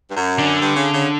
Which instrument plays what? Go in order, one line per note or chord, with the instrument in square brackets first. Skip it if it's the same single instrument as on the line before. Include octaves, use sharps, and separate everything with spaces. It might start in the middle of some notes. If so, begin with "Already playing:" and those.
[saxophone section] G2
F#2
[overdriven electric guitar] D3
[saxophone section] G2
C#3
C#3